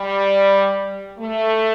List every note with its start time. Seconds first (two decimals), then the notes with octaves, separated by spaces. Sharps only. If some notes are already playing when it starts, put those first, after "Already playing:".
Already playing: G3
1.19 A3